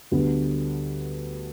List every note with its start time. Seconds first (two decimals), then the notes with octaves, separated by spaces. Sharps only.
0.12 D2 D3 G3 B3